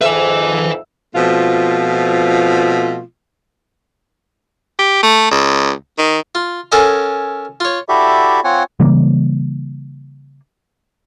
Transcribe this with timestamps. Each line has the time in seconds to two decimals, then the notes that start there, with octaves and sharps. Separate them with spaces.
0.01 F2 G#2 B4 E5 G#5
1.15 B2 F3 A3 C4 F4
4.79 G4
5.03 A3
5.31 C#2
5.98 D#3
6.35 F4
6.72 C#4 A4 A#4 D#5 F#5 G#5
7.60 F4 C#5
7.89 E4 F#4 G4 A4 D5 E5
8.44 C4 F4 C#5 F#5 G#5
8.80 C#3 E3 G3 A#3